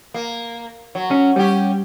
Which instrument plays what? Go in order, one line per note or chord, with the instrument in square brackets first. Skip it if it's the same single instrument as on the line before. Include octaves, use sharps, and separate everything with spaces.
[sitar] A#3
F#3
[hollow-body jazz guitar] C#4
[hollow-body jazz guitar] G3 [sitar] C#4 G4